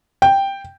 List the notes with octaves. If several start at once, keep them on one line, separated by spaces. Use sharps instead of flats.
G5